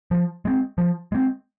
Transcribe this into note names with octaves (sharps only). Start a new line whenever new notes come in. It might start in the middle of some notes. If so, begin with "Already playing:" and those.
F3
G#3 C4
F3
G#3 C4